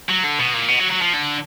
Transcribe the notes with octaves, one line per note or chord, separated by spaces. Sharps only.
F#3
D3
B2
A#2
B2
F#3
F#3
F3
D3